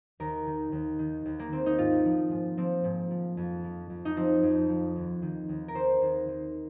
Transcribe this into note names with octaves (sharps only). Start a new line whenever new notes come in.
D#2 A#4
D#3
D#2
D#3
D#2
A#3
D#3 C4
D#4
G#2 F4
F3
G#2
F3 C4
G#2
F3
F2
F3
F2
D#4
F3 C4
F2
F3
D#2
D#3
D#2
A#4
D#3 C5
D#2
D#3